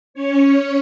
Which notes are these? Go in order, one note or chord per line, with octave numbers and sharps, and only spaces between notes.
C#4 C#5